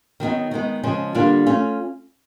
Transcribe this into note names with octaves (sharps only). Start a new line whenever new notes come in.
D#3 F#3 B3 D#4
D#3 G#3 B3
C#3 F3 G#3 C#4
D3 G3 A#3 D4 F4
A3 C#4 F4